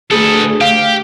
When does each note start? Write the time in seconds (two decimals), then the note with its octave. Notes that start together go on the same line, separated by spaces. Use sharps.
0.11 D2 G#4 A4 B4
0.61 G4 F5